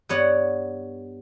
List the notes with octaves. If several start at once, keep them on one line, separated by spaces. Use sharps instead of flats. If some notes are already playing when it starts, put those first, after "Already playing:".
G2 B3 C#5 D5 F#5